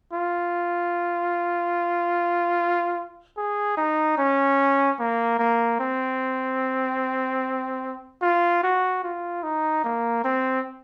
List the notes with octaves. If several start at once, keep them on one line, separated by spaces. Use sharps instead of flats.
F4
G#4
D#4
C#4
A#3
A#3
C4
F4
F#4
F4
D#4
A#3
C4